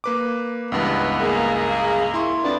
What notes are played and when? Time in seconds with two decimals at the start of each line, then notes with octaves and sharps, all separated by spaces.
0.04 A#3 B4 D6
0.72 C#2 G2 E3 B3
1.20 A#3 G#4
2.14 E4 C6 C#6
2.43 F2 B3 D4